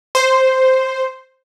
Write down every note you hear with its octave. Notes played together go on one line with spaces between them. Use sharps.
C5